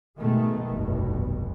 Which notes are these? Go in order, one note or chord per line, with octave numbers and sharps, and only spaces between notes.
G#2 B2 D#3 G#3 A3
F1 B1 G2 B2